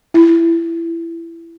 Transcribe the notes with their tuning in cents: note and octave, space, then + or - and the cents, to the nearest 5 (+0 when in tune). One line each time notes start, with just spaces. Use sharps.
E4 +20